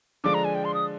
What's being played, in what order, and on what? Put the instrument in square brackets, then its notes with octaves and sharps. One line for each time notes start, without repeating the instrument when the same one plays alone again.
[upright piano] D3 F3 G#3 D4 [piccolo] D6
[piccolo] A#5
G#5
G5
C6
D#6